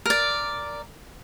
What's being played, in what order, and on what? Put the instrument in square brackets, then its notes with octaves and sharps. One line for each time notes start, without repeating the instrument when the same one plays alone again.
[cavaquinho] A#4 D5